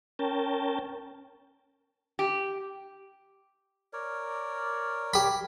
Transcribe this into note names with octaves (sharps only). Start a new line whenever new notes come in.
C#4 A#4 G5 A5
G4
A#4 C#5 D5
G4 B5